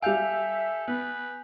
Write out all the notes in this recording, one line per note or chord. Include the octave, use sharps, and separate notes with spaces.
G3 A4 E5 F5 G#5 G6 F7
B3 B4